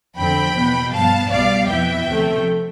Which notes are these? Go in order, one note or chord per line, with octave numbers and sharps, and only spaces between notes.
F2 D3 F3 C4 G5 B5
E2 B2 B3
G2 F3 B3 F5 A5
C2 B2 G3 D5 F5
F2 E3 B3 E5 G5
D2 C3 F3 A3